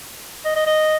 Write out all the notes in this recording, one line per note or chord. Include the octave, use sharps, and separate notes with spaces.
D#5
D#5
D#5